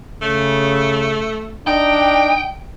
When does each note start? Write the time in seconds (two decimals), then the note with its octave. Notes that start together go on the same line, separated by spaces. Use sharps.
0.22 C#3 A3
1.67 D4 D#4 G5